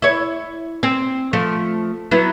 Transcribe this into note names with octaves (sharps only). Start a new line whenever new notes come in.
E4 C#5
C4
F3 A3
F#3 B3 E4